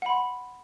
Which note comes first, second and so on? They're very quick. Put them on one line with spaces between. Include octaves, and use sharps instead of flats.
F#5 B5 C6